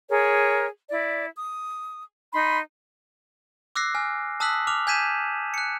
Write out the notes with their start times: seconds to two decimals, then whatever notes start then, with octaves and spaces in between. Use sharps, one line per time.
0.08 G#4 A#4 C#5
0.89 E4 D5
1.35 D#6
2.32 D#4 B5 C6
3.76 D6 E6 F#6 A#6 C7
3.95 G#5 F6
4.40 A5 D#6 E6 F#6 B6 F#7
4.67 D6 F6 F7
4.87 G#5 G6 G#6 B6 D#7 E7
5.54 F#6 C#7